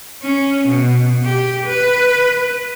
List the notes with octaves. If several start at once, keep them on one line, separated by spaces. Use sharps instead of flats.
C#4
B2
G4
B4